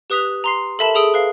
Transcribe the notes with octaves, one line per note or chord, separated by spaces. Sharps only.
G4 B4 D#6 F#6 B6 F7
A#5 C6 C7
A4 A#4 E5 A5 B5 E7
G#4 A4 D#6 E6 D7 G7
B4 F5